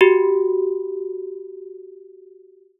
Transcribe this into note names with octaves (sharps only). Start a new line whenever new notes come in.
F#4 G4